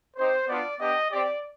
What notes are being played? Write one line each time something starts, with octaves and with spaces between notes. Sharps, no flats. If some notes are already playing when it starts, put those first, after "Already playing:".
C4 D#4 G4 C5
B3 D4 F4 D5
B3 D4 G4 D#5
C4 G4 D5